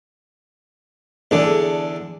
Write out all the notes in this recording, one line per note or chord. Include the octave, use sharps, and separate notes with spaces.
E2 D3 D4 G#4 A4